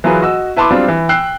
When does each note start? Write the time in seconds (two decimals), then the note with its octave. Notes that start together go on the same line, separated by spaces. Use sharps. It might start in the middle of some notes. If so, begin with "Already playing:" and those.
0.04 E3 F#3 F4 G#4 A#4 B4
0.22 F#4 D#5 E6
0.56 E4 B4 A5 B5 C6 D6
0.71 F#3 G3 C4 D4 F4
0.88 E3
1.09 G5 E6 F#6 C7